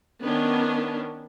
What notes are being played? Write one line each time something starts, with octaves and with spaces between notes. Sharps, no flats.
D#3 B3 C#4 D4